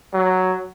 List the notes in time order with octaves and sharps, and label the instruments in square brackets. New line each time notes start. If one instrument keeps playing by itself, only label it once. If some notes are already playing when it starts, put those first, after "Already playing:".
[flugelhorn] F#3